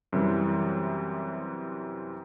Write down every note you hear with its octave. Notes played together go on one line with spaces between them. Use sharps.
F#2 C3 E3 G3